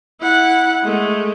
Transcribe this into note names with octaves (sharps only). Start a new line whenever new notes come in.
E4 F#5
G#3 A3